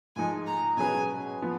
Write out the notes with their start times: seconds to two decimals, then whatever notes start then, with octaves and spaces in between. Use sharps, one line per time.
0.16 G#2 F3 G#3 D#4 G#5
0.47 A#5
0.77 B2 F#3 C#4 G#4 B4 G#5
1.42 F3 B3